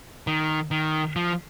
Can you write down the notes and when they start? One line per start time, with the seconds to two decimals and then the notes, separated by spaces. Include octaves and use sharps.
0.27 D#3
0.71 D#3
1.16 F3